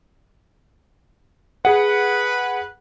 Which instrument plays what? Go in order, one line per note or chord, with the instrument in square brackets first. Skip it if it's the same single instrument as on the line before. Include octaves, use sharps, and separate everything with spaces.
[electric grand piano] G#4 F#5 [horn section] B4